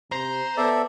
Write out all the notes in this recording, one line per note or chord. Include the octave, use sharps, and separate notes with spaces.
C3 C5 A#5
B3 A4 D5 E5